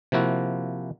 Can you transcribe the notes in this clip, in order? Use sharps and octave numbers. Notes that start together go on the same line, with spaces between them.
C3 F3 A#3 E4 F#4